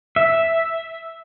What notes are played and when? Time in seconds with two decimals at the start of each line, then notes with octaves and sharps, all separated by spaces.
0.16 E5